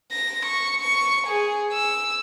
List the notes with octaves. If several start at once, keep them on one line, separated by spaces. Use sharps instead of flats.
A#6
C#6
C#6
G#4
E6